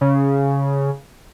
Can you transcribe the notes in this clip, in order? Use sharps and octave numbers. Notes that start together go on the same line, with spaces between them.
C#3